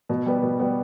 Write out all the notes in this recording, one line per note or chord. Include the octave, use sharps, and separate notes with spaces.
B2
G3 B3
B2
G3 B3